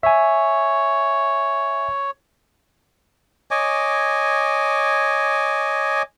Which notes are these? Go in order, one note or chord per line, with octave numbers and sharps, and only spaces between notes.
C#5 E5 G#5
C#5 D#5 G#5 D6